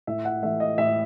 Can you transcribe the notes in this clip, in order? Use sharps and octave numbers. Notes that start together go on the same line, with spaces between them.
A2 E5
F#5
E3 A3 E5
D#5
A2 E5